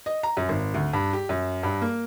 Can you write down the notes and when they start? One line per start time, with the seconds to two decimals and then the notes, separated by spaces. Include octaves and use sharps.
0.06 D#5
0.23 A#5
0.37 F#2
0.49 G#1
0.74 D2
0.93 G2
1.13 G4
1.29 F#2
1.63 G2
1.82 A#3